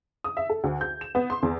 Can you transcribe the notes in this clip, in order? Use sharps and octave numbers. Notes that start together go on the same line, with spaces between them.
D#6
E5
A4
D2
G6
E7
B3
C6
E2